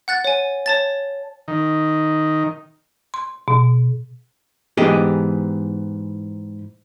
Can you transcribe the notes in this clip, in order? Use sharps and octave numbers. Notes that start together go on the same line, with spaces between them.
F#5 F#6 A6
C#5 G#5
C#5 A5 A6
D#3
C6
B2
G#2 E3 B3 G4 G#4 D#5